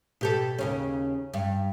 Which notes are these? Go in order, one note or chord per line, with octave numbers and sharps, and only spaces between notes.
B2 G4 A4
D#2 C#3 C#4
G2